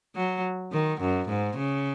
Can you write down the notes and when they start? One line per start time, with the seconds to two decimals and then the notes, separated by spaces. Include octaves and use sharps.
0.16 F#3
0.73 D#3
1.01 F#2
1.28 G#2
1.57 C#3